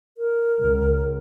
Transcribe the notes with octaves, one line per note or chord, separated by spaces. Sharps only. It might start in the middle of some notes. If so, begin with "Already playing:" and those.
A#4
C#2